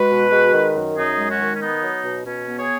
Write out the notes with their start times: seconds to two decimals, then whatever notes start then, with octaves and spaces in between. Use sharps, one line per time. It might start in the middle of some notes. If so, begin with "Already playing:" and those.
Already playing: G#3 F#4 B4
0.11 B2
0.32 G#3
0.54 D#3
0.75 F#2
0.97 F#2 D#4 G#4
1.18 G#3
1.29 C#4 F#4
1.39 D#3
1.54 C#4
1.62 B3 D#4
1.83 F#3
2.05 B2
2.25 B2 C#4
2.47 B3
2.58 G#4 C#5